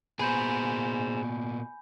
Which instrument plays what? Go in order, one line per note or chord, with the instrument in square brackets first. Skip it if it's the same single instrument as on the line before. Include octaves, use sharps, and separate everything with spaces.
[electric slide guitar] A#2 B3 [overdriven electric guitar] G#4 C5 [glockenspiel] G#5 B5 G6